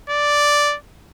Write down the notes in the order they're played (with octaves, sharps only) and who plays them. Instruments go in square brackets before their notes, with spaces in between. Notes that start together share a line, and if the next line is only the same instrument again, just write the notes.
[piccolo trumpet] D5